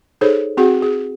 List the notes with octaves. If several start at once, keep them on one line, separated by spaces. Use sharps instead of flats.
D#4 G#4 A4 C5 C#5
C4 F#4 G#4 F#5
G#4